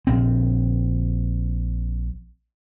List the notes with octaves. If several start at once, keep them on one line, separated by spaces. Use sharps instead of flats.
A#1 C4